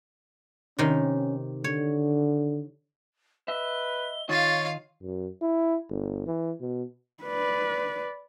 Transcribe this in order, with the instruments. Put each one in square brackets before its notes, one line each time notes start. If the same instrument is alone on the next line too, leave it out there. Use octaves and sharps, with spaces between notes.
[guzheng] C3 D#3 [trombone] C#4
[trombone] D3 [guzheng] C#5
[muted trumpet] B4 [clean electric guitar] D#5 E5 [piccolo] G7
[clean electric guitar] D#3 D#4 D#5 [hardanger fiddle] F4 F5 [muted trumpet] C#5 [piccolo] A6
[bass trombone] F#2
E4
G1
E3
B2
[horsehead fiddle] B4 D5